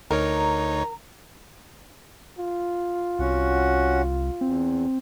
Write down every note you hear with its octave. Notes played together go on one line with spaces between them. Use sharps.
D2 D#4 A#4 C#5 A#5
F4
C2 C#4 F#4 F#5
E2 C4